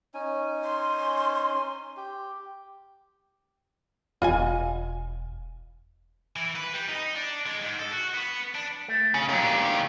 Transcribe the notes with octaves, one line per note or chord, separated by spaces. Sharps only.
C#4 D#4 G#5
C6
G4
E1 F4 D#5 G#5
E3
B4
G3
D#4
D4
G#3
G#2
A4
F#4
B3
D4
A3
C#3 C#4
A#2 D#3 F#3 F5
D4 G4